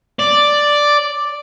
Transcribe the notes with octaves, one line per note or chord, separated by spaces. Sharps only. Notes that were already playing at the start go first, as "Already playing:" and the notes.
D5